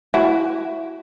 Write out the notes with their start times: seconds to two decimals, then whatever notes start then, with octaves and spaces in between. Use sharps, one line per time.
0.14 E4 F#4